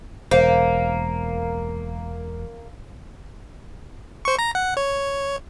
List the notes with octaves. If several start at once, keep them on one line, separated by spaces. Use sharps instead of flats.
E1 A#3 C5
C5 C#6
A#5 A#6
F#5
C#5